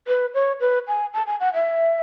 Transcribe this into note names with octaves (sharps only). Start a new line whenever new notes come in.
B4
C#5
B4
G#5
A5
G#5
F#5
E5